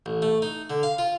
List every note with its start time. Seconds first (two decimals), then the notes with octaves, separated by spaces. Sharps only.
0.06 A1
0.22 A3
0.42 D#4
0.70 D3
0.83 F5
0.98 F4